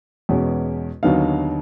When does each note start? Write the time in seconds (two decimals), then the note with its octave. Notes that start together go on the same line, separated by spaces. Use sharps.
0.29 E2 B2 G#3 C#4
1.03 D#2 D3 F#3 B3 D#4 F5